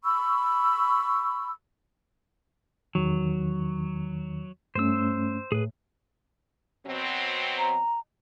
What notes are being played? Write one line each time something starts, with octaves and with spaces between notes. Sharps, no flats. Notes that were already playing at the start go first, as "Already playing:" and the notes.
B5 C#6 E6
E2 D#3 F#3
G2 A3 C#4 C5 E6
A2 G#4 B4
B2 F#3 C4
A#5